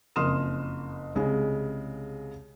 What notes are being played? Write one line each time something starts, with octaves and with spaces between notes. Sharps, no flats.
F#1 F2 C6 D#6 F6 E7
C2 C#3 G#3